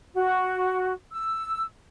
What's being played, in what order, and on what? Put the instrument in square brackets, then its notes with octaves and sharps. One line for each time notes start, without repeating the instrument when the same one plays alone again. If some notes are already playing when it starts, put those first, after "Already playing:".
[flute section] F#4
E6